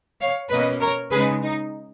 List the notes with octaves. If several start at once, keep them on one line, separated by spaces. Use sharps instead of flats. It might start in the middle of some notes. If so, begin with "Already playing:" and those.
C#5 F5
B2 A#3 C#4 B4 D#5
A#4 C#5
C#3 G#3 D#4 G#4 B4
D#4